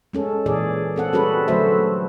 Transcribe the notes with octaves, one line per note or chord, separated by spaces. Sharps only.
G#3 C#4 A4
A#2 E3 G#4 D5
C4 A4 F#5
G3 C#4 F#4 G#4 A4 B4
D3 F#3 A3 F#4 C5 E5